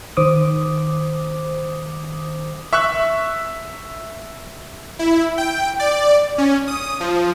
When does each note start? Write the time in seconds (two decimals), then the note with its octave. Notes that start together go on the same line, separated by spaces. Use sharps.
0.17 D#3 C5 D6 D#6
2.73 E5 C#6 E6 F#6
4.99 E4
5.38 G5
5.79 D5
6.38 C#4
6.68 D#6
7.00 F3